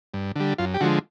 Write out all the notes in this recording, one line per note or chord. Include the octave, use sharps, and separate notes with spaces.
G2
D3 G3
F#2 F4
G4
D3 F3 G#3 F#4